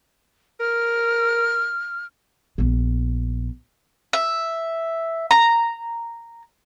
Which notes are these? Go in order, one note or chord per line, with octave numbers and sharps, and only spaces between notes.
A#4 F6
A#1 B3
E5
A#5